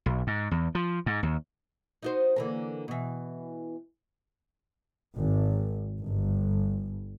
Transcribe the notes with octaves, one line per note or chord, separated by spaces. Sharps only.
B1
G#2
E2
F3
G#2
D#2
D#4 F#4 C5
D3 E3 A#3
B2 E3
G#1
G1